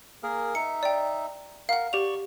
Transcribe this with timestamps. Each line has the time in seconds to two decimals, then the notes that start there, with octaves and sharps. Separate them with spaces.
0.23 A#3 G#4 A#4
0.55 D#4 E5 C#7
0.83 D5 G5
1.69 A#4 F5 F#5
1.93 G4 D5 C#6 F7